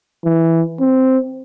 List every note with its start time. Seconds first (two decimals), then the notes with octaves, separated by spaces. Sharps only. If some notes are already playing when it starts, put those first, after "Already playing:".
0.25 E3
0.80 C4